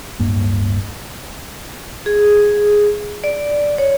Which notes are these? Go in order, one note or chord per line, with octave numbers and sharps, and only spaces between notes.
D1 G2 A#3
G#4
D5
C#5